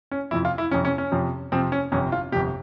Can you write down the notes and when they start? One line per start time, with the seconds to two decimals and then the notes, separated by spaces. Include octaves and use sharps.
0.11 C#4
0.31 F2 C3 F3 E4
0.45 F4
0.58 E4
0.71 F2 C3 F3 C#4
0.85 C#4
0.98 C#4
1.12 F2 C3 F3
1.52 F2 C3 F3 C4
1.72 C#4
1.92 G1 F2 C3 C#4
2.12 F4
2.32 G1 F2 C3 G4